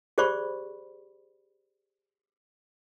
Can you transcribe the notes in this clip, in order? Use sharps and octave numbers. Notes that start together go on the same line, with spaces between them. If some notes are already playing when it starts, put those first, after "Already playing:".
G4 G#4 C5 D5 B5 C#6